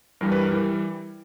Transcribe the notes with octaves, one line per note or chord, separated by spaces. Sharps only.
G2 E3 G3 A#4
B4
A#4
E3 G3